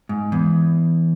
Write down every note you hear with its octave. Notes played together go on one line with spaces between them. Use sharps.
G#2
E2